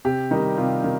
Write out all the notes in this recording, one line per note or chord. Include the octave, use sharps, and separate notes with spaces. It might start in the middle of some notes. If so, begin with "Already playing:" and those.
C3 G4
D#3 G3 D#4
C3 F4
D#3